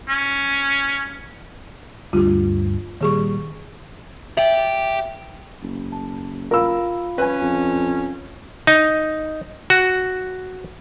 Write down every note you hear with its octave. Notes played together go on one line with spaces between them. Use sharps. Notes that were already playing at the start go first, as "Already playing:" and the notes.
C#4
D2 G2 F4 G4
A#2 D#3 G3 G#4 C#6
G4 E5 G5
F#1
A5
F4 A#4 F5 B5 E6
C#4 B4 G#5
F2
D#4
F#4